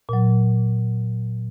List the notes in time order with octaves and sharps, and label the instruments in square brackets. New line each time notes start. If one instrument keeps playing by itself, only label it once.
[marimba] A#2 F#3